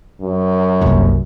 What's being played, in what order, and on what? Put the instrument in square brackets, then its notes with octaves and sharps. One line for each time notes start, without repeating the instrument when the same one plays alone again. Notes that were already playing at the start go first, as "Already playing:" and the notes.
[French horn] F#2
[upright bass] F#1 C2